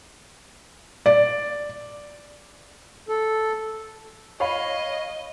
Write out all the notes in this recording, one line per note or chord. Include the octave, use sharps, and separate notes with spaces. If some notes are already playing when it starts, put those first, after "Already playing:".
D5
A4
C#5 D#5 F5 B5